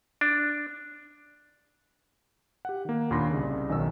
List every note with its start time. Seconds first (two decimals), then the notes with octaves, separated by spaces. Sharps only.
0.21 D4
2.65 G4 F#5
2.85 D#3 A#3
3.10 D#2 A#2 D4 B5 C6 A#6
3.31 C2 C#3
3.69 B1 D#3 C#4 E6